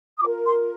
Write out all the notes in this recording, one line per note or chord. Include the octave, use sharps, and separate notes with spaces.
D#6
F4 A#4 D6
C6